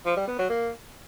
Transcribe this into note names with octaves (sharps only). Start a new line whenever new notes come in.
F3
G3
B3
F#3
A#3